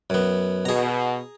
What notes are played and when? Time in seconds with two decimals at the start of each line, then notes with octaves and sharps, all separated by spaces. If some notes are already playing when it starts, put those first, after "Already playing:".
0.10 F#2 B3
0.65 B2 G#4 A#5